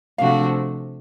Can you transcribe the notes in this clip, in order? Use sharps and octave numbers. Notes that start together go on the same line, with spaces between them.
C3 F3 A3 D4 F#4 F5